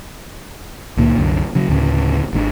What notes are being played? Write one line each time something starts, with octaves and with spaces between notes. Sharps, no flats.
C#2 A#2 D#3
C2 F#2 D3
C#3 F#3
D2 A2 C#3 C#4
G#1 G#2 D4